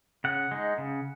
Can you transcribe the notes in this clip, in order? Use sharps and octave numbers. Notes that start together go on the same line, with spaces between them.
C#3 F#5
G#3 D#4
C#3